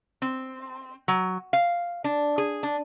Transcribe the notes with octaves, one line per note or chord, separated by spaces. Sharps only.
C4
F#3
F5
D4
G#4
D4